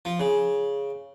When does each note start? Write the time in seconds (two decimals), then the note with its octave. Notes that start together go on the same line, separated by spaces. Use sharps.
0.05 F3
0.20 C#3